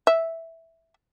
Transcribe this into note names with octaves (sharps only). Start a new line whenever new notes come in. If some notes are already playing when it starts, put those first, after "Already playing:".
E5